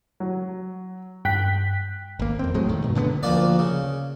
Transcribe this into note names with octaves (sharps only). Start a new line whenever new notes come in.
F#3
G2 G5 F#6 B6
G#1 A#3
F2 C4
A2 F#3 G#3 A3
C2 A2 D#3
G2 B2
A#2 D3 A3 B3
D2 F3 A#3 D5
C#3